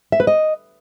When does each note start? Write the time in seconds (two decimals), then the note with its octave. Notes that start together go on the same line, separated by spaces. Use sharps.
0.12 E5
0.20 B4
0.27 D#5